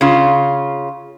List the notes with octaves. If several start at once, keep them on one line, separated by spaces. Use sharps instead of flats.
C#3 F4